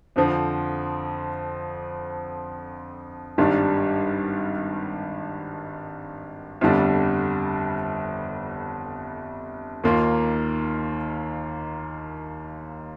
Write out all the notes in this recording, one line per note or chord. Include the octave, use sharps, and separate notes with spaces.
F2 D3 F3 C4
G#1 G2 D#3 G3 D4
G1 F2 D3 G3 D4
D#2 D#3 A#3 F4 A#4